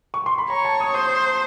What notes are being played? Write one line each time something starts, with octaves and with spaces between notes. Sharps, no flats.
C#6
C6
B5
C#5 A#5
A5
D#6
C5 D#6